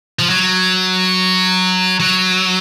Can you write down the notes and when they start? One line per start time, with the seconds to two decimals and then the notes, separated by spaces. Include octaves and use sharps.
0.19 F3
0.30 F#3
2.00 F#3